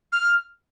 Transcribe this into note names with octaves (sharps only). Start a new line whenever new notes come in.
F6